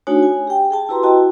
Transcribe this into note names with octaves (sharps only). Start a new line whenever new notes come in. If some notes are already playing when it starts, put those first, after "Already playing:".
A3 D4 D#4 F#4 C#5 G#5
G#5
G4 G5
G#4 G5 A5
E4 F#4 G4 B4 A#5 C6
E4 F#4 D#5 G5 A5